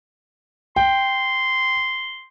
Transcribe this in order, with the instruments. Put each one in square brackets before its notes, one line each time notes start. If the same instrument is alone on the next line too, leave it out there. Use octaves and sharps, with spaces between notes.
[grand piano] G5 [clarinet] C6